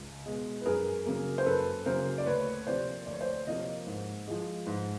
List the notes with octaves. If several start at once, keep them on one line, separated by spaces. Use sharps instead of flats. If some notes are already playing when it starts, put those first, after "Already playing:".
Already playing: C#2
B2 G#3
B4
F#2 G#4 A#4
C#3 F#3 A#3
C5
F#2 A4 B4
C#3 F#3 A#3 A#4 C5
D5
D2 B4 C#5
C3 F3 A#3 C5 D5
D2 D5
C#5
C5 D5
C3 F3 A#3 C#5 D#5
G#2
F3 G#3
G#2